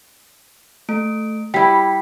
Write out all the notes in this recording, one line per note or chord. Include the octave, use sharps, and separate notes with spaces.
A3 D7
G3 E4 G5 B6